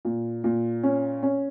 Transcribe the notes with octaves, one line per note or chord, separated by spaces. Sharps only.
A#2
A#2
C#4
C#4